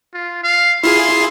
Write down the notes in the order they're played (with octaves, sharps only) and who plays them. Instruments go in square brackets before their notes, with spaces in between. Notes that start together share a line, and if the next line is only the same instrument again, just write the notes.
[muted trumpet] F4
F5
[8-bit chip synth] E4 F4 G#4 [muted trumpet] C6